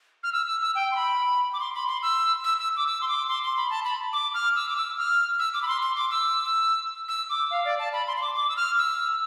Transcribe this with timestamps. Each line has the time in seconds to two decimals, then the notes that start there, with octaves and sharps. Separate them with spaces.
0.23 F6
0.32 E6
0.47 E6
0.61 E6
0.75 G5
0.92 C6
0.96 B5
1.53 D6
1.60 C6
1.74 B5
1.88 C6
2.03 E6
2.44 E6
2.59 E6
2.76 D6
2.87 E6
3.01 C6
3.08 D6
3.29 C6
3.43 C6
3.57 B5
3.70 A5
3.85 B5
4.13 D6
4.34 F6
4.56 E6
4.69 D6
4.76 E6
4.98 F6
5.39 E6
5.54 D6
5.62 B5
5.68 C6
5.82 C6
5.96 D6
6.11 E6
7.08 E6
7.30 D6
7.51 F5
7.65 D5
7.79 A5
7.93 B5
8.07 C6
8.17 C6
8.22 D6
8.35 D6
8.49 E6
8.56 F6
8.78 E6